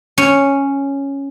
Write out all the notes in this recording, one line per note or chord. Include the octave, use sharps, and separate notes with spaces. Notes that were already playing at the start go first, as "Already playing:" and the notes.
C#4